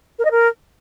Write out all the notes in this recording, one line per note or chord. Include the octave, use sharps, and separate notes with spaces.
A#4
D#5
A#4